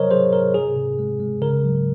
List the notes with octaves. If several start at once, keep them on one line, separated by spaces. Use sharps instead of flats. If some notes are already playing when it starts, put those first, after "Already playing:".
Already playing: C3 F#3 A#4 C5 C#5 D#5
F#3 G#4 C5
C3 A#4
C3 G#4
C3
G#3
G#3
C#3 A#4
F#3